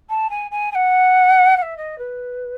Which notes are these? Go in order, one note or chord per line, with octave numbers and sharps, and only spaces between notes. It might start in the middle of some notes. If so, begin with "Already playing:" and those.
A5
G#5
G#5
G#5
F#5
F#5
E5
D#5
B4